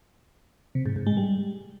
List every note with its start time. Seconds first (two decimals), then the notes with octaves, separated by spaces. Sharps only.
0.75 C3
0.86 G#2
0.96 G#2
1.07 G#3
1.17 G3